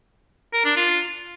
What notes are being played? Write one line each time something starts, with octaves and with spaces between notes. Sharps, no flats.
A#4
D4
F4